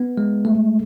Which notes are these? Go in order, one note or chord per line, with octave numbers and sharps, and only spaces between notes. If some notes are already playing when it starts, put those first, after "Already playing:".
Already playing: B3
G#3
A3